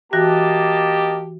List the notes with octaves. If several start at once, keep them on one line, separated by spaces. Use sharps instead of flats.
E3 A#3 F#4 G4 D#5 A5 A#6